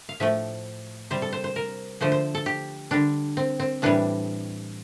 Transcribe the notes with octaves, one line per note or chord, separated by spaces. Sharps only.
F5
A2 F3 A3 E5
C3 G3 C5
A4
C5
C5
A#4
D3 F3 A3 C5
C5
A4
G4
D3 G3 D4
C4
C4
A2 E3 G3 D4